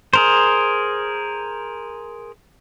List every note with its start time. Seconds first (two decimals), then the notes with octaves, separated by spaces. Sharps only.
0.13 G#4 A#4 C5